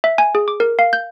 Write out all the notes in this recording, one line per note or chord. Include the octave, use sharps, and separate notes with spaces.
E5
G#5
G#4
D6
A#4
F5
G6